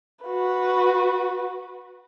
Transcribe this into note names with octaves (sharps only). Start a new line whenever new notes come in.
F#4 B4